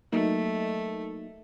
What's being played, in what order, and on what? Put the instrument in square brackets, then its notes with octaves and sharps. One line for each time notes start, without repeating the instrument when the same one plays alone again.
[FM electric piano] F#3 A#3 D#4 [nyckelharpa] A3